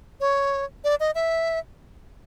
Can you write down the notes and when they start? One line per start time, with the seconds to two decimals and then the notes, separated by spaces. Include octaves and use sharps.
0.20 C#5
0.84 D5
1.00 D#5
1.15 E5